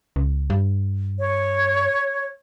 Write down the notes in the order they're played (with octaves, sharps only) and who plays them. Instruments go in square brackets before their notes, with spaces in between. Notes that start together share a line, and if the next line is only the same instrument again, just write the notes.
[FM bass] C#2
G2
[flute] C#5